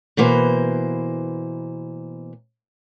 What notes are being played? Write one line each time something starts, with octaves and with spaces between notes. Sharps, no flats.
B2 E3 A#3 C5